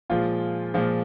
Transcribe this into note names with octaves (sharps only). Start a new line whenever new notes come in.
A#2 F3 G#3 F4
A#2 F3 G#3